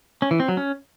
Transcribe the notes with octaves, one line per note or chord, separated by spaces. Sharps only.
C#4
E3
C4
F#3
C#4